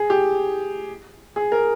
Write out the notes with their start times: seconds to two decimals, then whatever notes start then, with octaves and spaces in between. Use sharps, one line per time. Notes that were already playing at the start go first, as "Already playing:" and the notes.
Already playing: G#4
0.10 G4
1.36 G#4
1.52 A#4